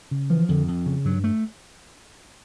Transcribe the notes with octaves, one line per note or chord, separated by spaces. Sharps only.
C#3
E3 F3
F2 D3
F2
C#3
G2 F#3
A3